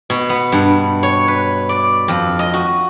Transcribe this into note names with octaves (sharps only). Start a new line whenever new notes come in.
B2
B3
G2
C#5
B4
D5
F2
D#5
F#4